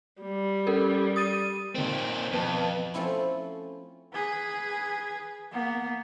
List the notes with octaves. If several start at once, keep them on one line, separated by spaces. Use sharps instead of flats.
G3
C#4 A4 A#4
D#6 A6 D#7
A#2 D#3 A#3 C4
F2 B2 B4 A5
F3 A3 C4 C#4 E4
G#4 B4
A#3 B3